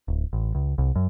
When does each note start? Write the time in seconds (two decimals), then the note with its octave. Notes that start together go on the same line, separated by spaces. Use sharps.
0.08 D1
0.33 A1
0.55 C#2
0.78 C2
0.96 F#2